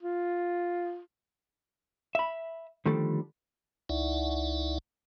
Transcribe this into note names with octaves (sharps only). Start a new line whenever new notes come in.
F4
E5 B5
D3 D#3 F3 G3 A3 A4
C#2 D#4 E4 D5 E5 F#5